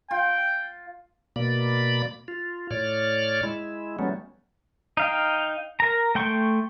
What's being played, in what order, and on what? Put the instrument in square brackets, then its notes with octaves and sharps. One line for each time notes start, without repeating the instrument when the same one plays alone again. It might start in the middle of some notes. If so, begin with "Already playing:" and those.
[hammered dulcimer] F4 [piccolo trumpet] G5
[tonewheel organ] B2 A#3 D5 B5
F4
A2 C#5 D5 F6
G#3 E4
F#3 G3 A3 B3 C#4
[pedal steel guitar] D#4 F5 G5
A#4 A#5
A3 G5 C6 C#6